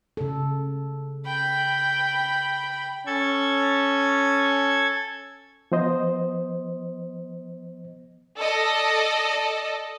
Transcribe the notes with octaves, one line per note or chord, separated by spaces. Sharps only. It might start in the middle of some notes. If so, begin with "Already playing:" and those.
C#3 A4
G5 B5
C#4 A4 G#6
F3 B3 C5 D#5
A4 D5 D#5